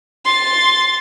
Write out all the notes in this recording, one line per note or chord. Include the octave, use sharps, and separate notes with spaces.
C6 A6